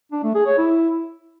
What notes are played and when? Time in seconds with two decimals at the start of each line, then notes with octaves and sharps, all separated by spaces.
0.12 D4
0.24 A3
0.35 G#4
0.46 C#5
0.58 E4